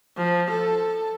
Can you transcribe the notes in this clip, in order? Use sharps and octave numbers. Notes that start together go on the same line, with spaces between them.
F3
A4